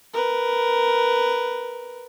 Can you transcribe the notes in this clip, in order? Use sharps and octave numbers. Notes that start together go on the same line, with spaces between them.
A#4 B4